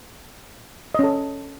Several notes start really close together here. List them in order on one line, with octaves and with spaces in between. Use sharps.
D#5 C#4 A4